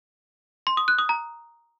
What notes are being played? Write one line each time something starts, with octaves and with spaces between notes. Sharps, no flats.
C6
D#6
F#6
D#6
A#5